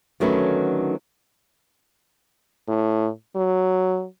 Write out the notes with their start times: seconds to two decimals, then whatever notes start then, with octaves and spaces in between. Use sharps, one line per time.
0.20 D3 D#3 F#3 A3 C#4 B4
2.68 A2
3.36 F#3